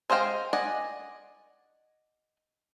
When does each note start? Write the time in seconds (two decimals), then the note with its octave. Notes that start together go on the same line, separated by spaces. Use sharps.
0.10 G#3 C5 D#5 F5 G5
0.53 D5 D#5 F#5 G#5